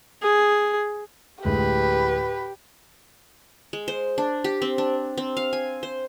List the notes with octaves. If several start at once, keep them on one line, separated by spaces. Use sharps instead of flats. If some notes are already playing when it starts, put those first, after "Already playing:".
G#4
D2 A2 G#3 G4 B4
G#3
C5
D4
G4
C4
D4
C4
F5
G#5
C5